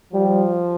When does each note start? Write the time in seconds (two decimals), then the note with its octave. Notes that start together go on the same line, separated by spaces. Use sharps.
0.13 F3 G3